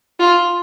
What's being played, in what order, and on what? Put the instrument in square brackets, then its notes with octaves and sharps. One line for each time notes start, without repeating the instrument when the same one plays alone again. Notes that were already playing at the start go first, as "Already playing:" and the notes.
[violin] F4